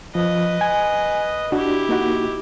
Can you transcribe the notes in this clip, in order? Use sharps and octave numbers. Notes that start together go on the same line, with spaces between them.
F3 B4 D#5
G#5
D4 E4 F#4 G4
A#3 D#4 F#4